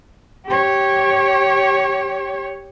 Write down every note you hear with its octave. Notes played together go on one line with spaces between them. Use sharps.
G4 C#5